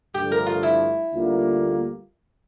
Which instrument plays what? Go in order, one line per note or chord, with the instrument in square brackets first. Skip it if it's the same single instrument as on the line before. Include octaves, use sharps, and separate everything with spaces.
[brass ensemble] G2 D3 F3 A3 [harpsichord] G4
[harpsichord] A#4
F4
E4
[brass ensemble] D2 D3 G3 A#3 F4